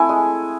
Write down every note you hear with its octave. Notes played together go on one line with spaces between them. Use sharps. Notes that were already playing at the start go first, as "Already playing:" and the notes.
Already playing: A3 C4 E4 G#5
G#3